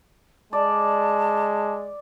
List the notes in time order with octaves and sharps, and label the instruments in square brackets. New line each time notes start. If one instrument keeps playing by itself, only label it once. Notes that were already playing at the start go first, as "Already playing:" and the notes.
[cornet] G#3 [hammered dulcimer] D5 [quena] A5